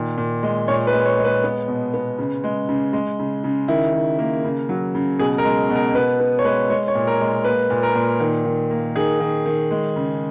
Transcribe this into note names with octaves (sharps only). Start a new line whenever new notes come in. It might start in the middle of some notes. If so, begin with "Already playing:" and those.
Already playing: A#2 D#3
A#2
G#3
A#2 C#5
B4
G#3
C#5
G#3
B4
B3
B2
B3
C#3
G#3
C#3
G#3
C#3
C#3
D#3 E4
D#3
A#3
C#3
F#3
C#3
B2 G#4
A#4
G#3
B2
A#4
B2 B4
B3
C#5
G#3 B4
G#3 C#5
C#5
A#2
A#4
G#3
A#3 B4
A#2
A#4
A#2
D#3
D#3
A#3
D#3 G#4
D#3
D#3
G#3
C#3